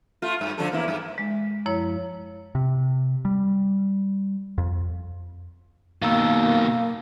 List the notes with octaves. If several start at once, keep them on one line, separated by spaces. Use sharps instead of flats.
A3 F4
G2
D3 F3 A4
E2 A#3 E4
G2
G#3
F#2 F3 E4 C#5
C3
G3
F2
B2 D#3 A#3 F5 A#5 E6